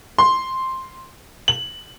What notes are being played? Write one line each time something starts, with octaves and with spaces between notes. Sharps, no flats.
C6
F#7